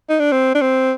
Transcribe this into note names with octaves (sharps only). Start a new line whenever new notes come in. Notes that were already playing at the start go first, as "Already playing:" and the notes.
D#4
D4
C4
D4
C4